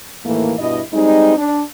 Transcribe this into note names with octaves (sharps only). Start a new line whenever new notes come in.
D#2 A2 E3 A3 A#3
G2 B2 E4 D#5
G3 G#3 C4 D#4
D4